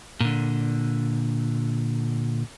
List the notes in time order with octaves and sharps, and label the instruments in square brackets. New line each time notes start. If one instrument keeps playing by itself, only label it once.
[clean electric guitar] A#2 D3